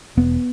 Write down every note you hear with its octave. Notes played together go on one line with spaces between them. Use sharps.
E1 B3